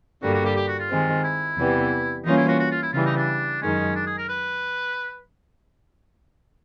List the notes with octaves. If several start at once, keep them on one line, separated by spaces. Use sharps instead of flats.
G2 D3 G3 A#3 F#4
F#4
G4
G4
F#4
F4
D#3 G#3 C4
E4
E2 C3 E3 G3 B3
E3 G3 A#3 C#4 D#4 F4
E4
F#4
F#4
F4
E4
C#3 E3 G3 F4
D#4
D4
F#2 D#3 G#3 C#4
D4
G#4
A#4
B4